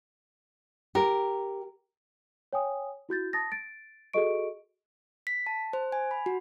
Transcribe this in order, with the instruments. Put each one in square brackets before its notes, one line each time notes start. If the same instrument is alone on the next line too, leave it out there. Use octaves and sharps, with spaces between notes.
[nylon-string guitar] G4 [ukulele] A#4
[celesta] C#5 G5 G#5 D#6
E4 F#4 G6 A6
A5 D#6 A6 A#6
A6 D7
F#4 G#4 A4 D#5 C#6 D7
[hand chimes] B6
A5
C5
G#5
B5
F#4